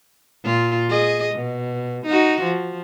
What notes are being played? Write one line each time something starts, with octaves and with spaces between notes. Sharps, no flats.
A#2 F4
G#4 D#5
B2
D#4 F#4
F3